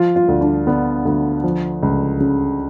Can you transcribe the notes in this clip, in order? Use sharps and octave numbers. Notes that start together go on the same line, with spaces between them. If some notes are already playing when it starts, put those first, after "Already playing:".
Already playing: F3 F4
F4
D2
D4
D3 B3
D2
F3
C#2
C#3